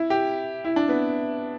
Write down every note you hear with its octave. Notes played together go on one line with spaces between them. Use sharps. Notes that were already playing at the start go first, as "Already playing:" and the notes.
Already playing: E4
G4
E4
D4
B3